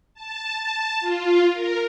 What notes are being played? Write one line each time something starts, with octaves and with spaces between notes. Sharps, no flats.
A5
A5
F4
A#4